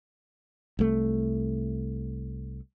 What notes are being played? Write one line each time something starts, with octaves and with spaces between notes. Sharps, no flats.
C2 A3